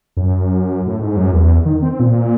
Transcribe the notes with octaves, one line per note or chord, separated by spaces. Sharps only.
F#2
A2
G#2
F#2
E2
D#3
C4
A#2